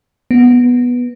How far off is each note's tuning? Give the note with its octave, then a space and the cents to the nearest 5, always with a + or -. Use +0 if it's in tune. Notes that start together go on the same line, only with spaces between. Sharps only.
B3 -5